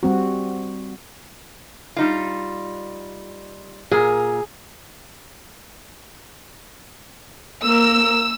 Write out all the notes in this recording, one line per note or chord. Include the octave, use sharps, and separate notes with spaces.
G3 C4 F#4
G3 D#4 F4
A#2 G#4 A#4
A#3 A#4 E6